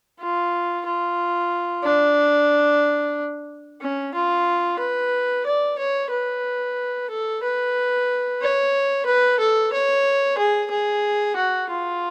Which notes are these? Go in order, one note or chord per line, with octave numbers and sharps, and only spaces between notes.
F4
F4
D4
C#4
F4
B4
D5
C#5
B4
A4
B4
C#5
B4
A4
C#5
G#4
G#4
F#4
F4